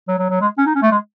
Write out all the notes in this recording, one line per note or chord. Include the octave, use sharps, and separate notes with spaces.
F#3
F#3
F#3
G#3
C#4
D#4
C#4
A3
G#3